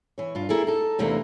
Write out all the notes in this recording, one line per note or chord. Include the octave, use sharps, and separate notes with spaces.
E3 C#5
G2 F4
A#3 E4 G#4 A4
D#4 A4
E2 C3 E3 A3 A#3 D4